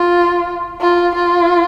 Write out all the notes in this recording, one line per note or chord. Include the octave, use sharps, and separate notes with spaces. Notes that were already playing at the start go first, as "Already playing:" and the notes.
Already playing: F4
F4
F4